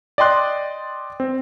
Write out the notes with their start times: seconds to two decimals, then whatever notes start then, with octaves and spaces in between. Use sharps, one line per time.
0.18 D5 D#5 G5 C6 F#6
1.20 C4